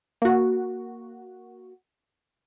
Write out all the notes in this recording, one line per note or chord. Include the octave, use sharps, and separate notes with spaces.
A#3 F#4